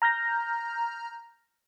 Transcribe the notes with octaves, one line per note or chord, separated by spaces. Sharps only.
A#5 F6 G6 A#6